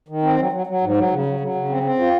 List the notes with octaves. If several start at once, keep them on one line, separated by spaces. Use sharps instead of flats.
D#3
C4
F#3
F#3
F#3
G#2
F#3
C#3
F#3
F#3
C#3
C4
C4
F4